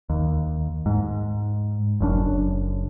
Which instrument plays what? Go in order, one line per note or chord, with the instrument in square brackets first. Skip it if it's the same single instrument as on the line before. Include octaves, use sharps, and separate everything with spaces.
[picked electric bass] D#2
G#2
F#1 F#2 D4